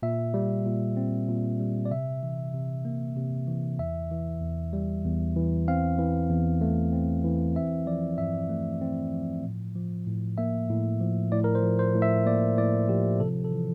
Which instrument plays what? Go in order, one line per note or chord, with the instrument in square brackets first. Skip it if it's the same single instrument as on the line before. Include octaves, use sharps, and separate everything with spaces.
[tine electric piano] A#2 E5
G3
A#2
C4
A#2
G3
D5
C3 E5
E3
C3
A#3
C3
E3
E2 E5
E3
E2
G3
E2
E3
C4 F5
E3
E2
A3
C4
E3
C4 E5
F3 D5
G2 E5
A3
C4
F3
A2
F3
A2
A#3 E5
A2
F3
A2 D5
A#4
C5
F3
C5
A2
E5
A#3 D5
A2 D5
F3 G4
C3 A4
A4
E3